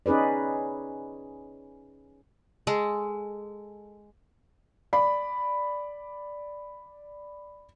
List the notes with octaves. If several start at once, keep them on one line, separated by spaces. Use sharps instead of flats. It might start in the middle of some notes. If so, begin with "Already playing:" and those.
C#4 D#4 G#4 B4 D5
G#3 A4
D5 B5